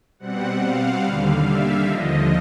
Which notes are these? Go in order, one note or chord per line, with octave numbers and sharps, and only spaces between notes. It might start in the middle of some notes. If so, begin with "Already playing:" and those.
B2 G3 C4 F#5
F5
D#2 D3 G3
E5
D#2 D3 F3 D#5